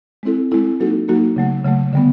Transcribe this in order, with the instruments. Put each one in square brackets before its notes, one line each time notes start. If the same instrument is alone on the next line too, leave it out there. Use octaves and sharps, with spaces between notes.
[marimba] G#3 C4 E4 A4
G#3 C4 E4 A4
F#3 A#3 D#4 F#4 A4
F#3 A#3 D#4 F#4 A4
C#3 F#3 A3
C#3 F#3 A3
D3 G3 B3